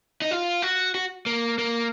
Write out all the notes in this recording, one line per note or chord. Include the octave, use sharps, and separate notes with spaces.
D#4
F4
F#4
F#4
A#3
A#3